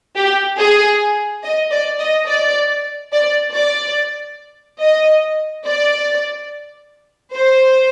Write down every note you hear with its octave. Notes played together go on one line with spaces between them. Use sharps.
G4
G#4
D#5
D5
D#5
D5
D5
D5
D#5
D5
C5